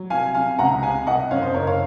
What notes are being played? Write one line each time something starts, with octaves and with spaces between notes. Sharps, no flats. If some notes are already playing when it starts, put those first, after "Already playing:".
Already playing: F#3
C2 F5 G#5
C3 F5 G#5
C#2 F#5 A#5
C3 F5 G#5
C2 D#5 F#5
F#2 C#5 F5
C5 D#5
F#1 A#4 C#5
C#5 F5